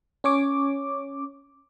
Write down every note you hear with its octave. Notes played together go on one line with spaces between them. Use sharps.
C#4 C#5 D6